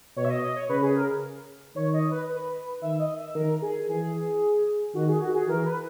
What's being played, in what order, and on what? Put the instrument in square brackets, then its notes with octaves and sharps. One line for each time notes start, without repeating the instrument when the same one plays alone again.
[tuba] B2 [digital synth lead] C#5
[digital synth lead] E5
D#5
D#5
C#5
[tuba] C#3 [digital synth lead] B4
[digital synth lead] G#4
A#4
[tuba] D#3 [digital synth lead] C#5
[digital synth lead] D#5
B4
B4
[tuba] D#3 [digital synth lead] E5
[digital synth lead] D#5
E5
[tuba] D#3 [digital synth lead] A#4
[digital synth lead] G#4
[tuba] E3 [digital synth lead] G#4
[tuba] D#3 [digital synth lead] F#4
[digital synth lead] G#4
F#4
G#4
[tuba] E3 [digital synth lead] A#4
[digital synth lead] B4